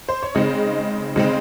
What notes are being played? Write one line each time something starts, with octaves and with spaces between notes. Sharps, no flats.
C5
C#5
C#3 G#3 C4 D#4 D#5
C#3 G#3 C4 D#4